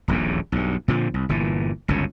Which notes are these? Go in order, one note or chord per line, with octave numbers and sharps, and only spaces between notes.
D#1 A#1 E2 A2
B1 G2
A#2 D3 F3
C2
G1 A#2 E3
G1 C#2 F#2 C#3